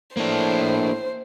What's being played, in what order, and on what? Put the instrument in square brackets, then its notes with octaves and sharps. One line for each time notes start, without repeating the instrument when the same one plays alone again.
[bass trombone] A2 [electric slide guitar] A#3 D4 [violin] C5